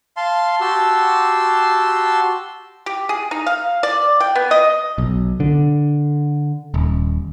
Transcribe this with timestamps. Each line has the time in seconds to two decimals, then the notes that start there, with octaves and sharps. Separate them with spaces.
0.17 F5 A5 C6
0.61 F#4 G4 A5 C6 E6
2.86 G4
3.09 G#4
3.31 D#4
3.46 F5
3.83 D5
4.20 G5
4.35 B3
4.51 D#5
4.98 B1
5.40 D3
6.74 D#1